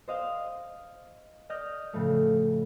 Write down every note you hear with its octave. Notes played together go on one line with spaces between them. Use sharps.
C5 D#5 F5
D5 D#5 F6 G6 A#6
A2 C#3 F3 A3